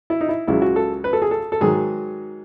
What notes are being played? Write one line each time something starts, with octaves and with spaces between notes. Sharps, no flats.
E4
D#4
E4
C#2 C#3 F#3 E4
F#4
A4
B4
A4
G#4
A4
A4
G#2 D#3 F#3 G#4